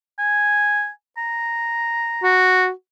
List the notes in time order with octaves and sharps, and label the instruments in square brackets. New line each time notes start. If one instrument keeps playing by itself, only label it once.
[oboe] G#5
A#5
[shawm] F#4